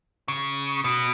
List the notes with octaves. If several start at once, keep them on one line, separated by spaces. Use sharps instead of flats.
C#3
B2